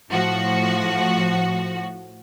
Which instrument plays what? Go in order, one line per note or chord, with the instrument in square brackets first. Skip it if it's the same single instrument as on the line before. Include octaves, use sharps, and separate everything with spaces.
[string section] A2 F3 F#4